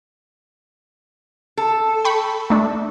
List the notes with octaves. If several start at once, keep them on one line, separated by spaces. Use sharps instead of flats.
A4
G5 B5 C#6
A3 D4